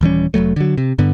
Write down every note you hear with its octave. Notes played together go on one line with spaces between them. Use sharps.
D#1 E3 G3 C#4
F1 D2 F#3 A3
D3 F#3
C3
G2 D3 B3